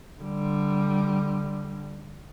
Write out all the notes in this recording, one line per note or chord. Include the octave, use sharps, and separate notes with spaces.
D3 G3